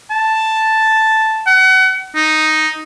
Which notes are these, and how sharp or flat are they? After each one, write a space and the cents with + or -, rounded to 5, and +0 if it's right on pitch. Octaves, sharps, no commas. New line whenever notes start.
A5 +0
F#5 +30
D#4 +0